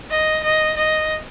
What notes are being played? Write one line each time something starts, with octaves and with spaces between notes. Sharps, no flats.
D#5
D#5
D#5